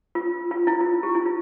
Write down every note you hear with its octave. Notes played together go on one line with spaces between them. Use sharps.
F4
F4
E4
F4
G4
E4
F4